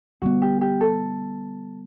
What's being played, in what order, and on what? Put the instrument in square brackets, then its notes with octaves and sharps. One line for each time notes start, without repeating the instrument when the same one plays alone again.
[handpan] D3 G3 B3 [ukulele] F#4
[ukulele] G4
G4
A4